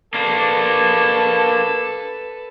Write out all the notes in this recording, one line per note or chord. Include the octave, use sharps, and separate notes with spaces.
A#3 D4 A4 B4